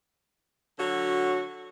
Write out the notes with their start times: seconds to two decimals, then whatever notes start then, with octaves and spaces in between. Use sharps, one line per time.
0.79 D3 F#3 F#4 C#5